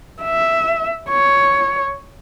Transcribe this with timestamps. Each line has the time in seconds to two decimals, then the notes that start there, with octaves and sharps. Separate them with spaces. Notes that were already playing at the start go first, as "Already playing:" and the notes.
0.22 E5
1.09 C#5